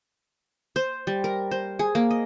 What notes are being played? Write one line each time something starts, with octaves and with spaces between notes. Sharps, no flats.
C5
G3
A#4
C5
G#4
A#3
D#5